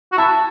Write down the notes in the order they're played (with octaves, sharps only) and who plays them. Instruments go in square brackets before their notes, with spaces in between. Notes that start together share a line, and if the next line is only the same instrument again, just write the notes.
[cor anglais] F#4
[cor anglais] E4 [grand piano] A5